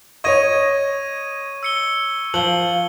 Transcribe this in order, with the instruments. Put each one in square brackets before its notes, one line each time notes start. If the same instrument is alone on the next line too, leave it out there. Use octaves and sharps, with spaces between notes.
[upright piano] C#5 D#5 [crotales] C#6 G#6 D#7
[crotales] E6 C#7 G7
[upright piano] F3 [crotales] F#7 G7